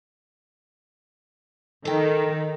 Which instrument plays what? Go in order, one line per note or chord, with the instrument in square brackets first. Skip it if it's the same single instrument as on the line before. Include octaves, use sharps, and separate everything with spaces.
[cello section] D#3 [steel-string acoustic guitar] A4 G5